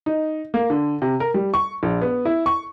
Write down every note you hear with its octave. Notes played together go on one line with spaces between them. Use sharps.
D#4
A#3
D3
C3
A#4
G3
C#6
A#1
B3
E4
C#6